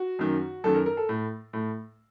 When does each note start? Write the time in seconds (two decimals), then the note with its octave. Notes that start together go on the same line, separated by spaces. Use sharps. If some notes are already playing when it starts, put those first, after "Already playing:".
Already playing: F#4
0.19 F#2 D#3
0.64 F#2 D#3 A4
0.75 A#4
0.86 A#4
0.97 A4
1.09 A2
1.53 A2